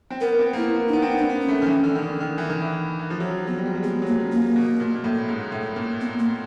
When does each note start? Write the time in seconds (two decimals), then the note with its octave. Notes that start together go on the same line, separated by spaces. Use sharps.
0.10 C4
0.21 B3 A#4
0.33 B3
0.39 C4
0.53 A#3
0.57 B3 E4
0.76 A#3
0.88 D4
0.93 B3 D#4
1.02 C4
1.11 B3
1.17 D4
1.30 B3
1.42 C#4
1.48 A3
1.62 D#3
1.67 E3
1.84 D3
1.95 D#3
2.02 D3
2.20 D#3
2.38 E3
2.50 D#3
2.62 E3
2.99 E3
3.10 F3
3.20 F#3
3.29 F3
3.47 F#3 B3
3.58 G3
3.66 G#3
3.75 G3
3.83 G#3 B3
4.02 F#3
4.07 A#3
4.19 C#3
4.32 A#3
4.56 B2
4.80 A#2
4.95 A#2
5.04 A2
5.29 G#2
5.52 A2
5.76 A#2
6.01 B3
6.19 A#3